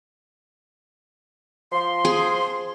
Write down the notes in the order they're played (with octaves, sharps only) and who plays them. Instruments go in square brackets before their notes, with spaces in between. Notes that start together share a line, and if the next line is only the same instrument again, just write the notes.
[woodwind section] F3 C6
[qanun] G#4